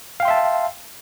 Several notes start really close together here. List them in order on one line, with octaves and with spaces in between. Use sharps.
F5 G5 C6 E5 A5